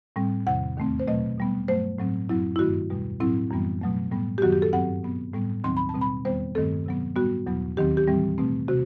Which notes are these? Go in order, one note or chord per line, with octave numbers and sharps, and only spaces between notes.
A2 G3 C4
E2 C3 D#3 F#5
D#2 D#3 A3 C4
C5
B2 F#3 A3 C4 D#5
B2 G3 B3
G2 F#3 A3 C5
A2 F#3 C4
F#2 F#3 C4 E4
E4
G2 D#3 A3 F#4
E2 B2 G3
A2 F#3 C4 E4
F#2 E3 G3 B3
B2 F#3 A3
A2 G3 B3
G4
F#2 D#3 F#3 B3 F#4
G4
A4
G2 F#3 C4 F#5
B2 F#3 B3
A2 G3 B3
D#2 D#3 F#3 C4 C6
B5
A5
B2 G3 C4
B5
E2 D#3 G3 B3 C5
G2 D#3 A3 C4 A4
C3 F#3 B3
A2 G3 B3 F#4
E2 B2 F#3 B3
D#2 D#3 F#3 C4 G4
G4
A2 E3 G3 C4
B2 A3 C4
C3 F#4